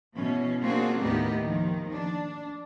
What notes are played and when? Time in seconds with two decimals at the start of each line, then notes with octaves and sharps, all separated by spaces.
0.15 B2 E3 C#4
0.62 A#3 C4 D4 F4 F#4 G#4
1.00 D#2 A2 B3 D#4 G4 A#4
1.42 D#2 D#3 F3
1.92 D4